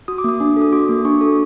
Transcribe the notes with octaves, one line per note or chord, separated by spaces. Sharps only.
F#4 D#6
D6
A#3 D#6
D4
A4
D#6
F#4 D6
A#3
D4 C#6
A4